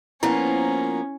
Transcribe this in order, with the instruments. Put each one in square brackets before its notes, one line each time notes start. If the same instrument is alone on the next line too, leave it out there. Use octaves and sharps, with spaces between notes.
[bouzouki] F3 A#3 B3 [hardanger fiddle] C#4 [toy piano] E4